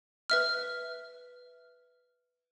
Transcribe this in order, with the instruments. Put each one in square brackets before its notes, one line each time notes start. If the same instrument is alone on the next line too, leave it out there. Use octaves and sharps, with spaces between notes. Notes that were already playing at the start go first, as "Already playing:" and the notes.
[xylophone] B4 E5 F6